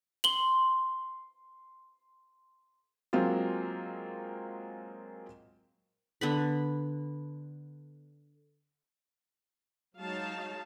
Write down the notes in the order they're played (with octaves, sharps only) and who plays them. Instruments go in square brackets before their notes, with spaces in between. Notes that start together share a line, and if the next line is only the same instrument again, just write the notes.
[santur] C6 [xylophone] F#7 G7
[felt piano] F#3 G#3 A#3 C4 F4
[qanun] D3 B3 B5
[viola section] F#3 G#3 D#4 C#5 F5 A5